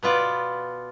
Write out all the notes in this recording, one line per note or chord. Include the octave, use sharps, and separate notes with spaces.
B2 B3 F4 D5